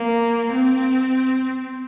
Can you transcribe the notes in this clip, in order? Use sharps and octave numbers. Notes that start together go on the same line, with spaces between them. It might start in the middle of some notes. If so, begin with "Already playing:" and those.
Already playing: A#3
C4